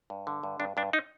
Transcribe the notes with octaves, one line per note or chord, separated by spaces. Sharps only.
G2
D3
G2
G2 D4
G2 D4
D#4